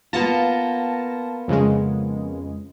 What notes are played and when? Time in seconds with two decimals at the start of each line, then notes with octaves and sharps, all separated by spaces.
0.13 A#3 B3 F4 A5 A#6
1.48 F2 C#3 G#3